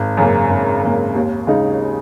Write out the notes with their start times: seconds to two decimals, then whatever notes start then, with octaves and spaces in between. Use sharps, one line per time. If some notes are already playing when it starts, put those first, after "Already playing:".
Already playing: G#1
0.17 F#2 C#3 A#3
0.49 G#1
0.82 F#2 C#3 A#3
1.15 D#2
1.47 C#3 G#3 D#4